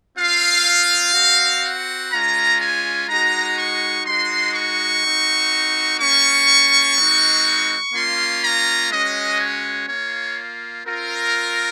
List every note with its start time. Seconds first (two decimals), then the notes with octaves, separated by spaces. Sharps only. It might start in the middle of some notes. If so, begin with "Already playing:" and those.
0.18 C4 F4 F5
1.14 C4 F#4
1.63 F#5
2.12 G#3 C#4 F4 A#5
2.60 G#5
3.09 G#3 D#4 F#4 A#5
3.58 C#6
4.06 G#3 D#4 F#4 C6
4.54 C#6
5.03 C4 D#4 F#4
6.00 A#3 C#4 F4 C#6
6.97 G#3 C4 D#4 F#4
7.93 A#3 C#4 F4 C6
8.43 A#5
8.91 G#3 C#4 F#4 D#5
9.39 C#5
9.88 A#3 F4 C#5
10.85 C4 F4 A#4